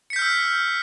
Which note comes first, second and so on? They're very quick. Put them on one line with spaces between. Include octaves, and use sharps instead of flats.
C#7 B6 G6 F6 E6